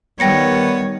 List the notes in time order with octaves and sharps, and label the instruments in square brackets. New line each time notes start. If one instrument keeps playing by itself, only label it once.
[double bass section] D#3 G3 [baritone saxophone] B3 [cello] C#5 [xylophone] G5 A#6 C#7